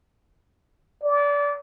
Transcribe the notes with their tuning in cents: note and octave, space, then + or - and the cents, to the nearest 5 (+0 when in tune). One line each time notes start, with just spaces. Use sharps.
D5 -25